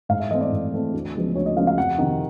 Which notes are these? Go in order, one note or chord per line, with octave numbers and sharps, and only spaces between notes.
G#2 F5
E5
E3 A3 C4 D#5
D5
G#2
E3 A3 C4
D2
C#3 F3 G#3 B3
D2 C#5
D#5
C#3 F3 G#3 B3 F5
F5
F2 F#5
C3 D#3